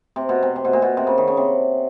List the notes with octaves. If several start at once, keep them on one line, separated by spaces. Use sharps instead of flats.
C3
B2
C3
C3
B2
A#2
B2
C3
C#3
D#3
C#3
C3